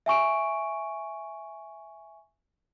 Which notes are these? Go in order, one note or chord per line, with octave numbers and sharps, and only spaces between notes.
E5 G#5 C#6 D7